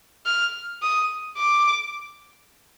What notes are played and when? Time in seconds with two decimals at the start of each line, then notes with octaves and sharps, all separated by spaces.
0.26 F6
0.83 D#6
1.37 D6